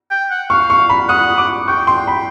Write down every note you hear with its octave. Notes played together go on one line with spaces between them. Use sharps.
G5
F#5
F5 C#6
C#6
B5
F#5 D#6
D6
G5 C#6
C6
B5